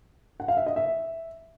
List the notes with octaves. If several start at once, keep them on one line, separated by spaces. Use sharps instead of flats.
F#5
F5
E5
D#5
E5